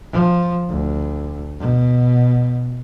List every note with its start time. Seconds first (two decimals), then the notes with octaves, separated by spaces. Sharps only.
0.12 F3
0.69 D2
1.59 B2